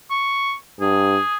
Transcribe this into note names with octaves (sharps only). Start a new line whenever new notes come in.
C#6
G2 G#4